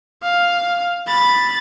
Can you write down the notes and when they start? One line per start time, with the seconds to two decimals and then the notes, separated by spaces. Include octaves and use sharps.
0.23 F5
1.07 B5 A6